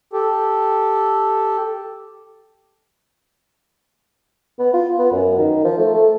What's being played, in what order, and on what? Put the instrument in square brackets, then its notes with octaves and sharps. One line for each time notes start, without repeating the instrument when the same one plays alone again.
[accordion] G4 A4
[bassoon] B3
F4
B3
F#2
D#3
F3
A3
A3